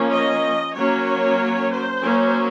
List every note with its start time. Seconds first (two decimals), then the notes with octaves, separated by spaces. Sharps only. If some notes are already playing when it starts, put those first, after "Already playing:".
Already playing: F3 A#3 C#4
0.11 D#5
0.75 F#3 A#3 C#4 C#5
1.72 C5
2.03 F#3 A#3 C#4